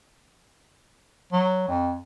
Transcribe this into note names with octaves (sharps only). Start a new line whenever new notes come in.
F#3
F2